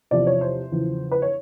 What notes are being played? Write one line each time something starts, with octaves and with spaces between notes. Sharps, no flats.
E2 C3 F3 D5
C#5
C5
E2 C#3 F3
B4
C#5